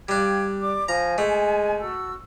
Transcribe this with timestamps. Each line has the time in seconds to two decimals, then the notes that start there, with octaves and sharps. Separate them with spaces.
0.09 G3 D4 F5 G5 G#6
0.61 D5 D6
0.88 F3 G#5 A#5
1.18 G#3 A3
1.80 F#4 A4 E6